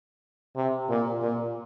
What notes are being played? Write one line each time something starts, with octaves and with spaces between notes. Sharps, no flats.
C3
A#2
A#2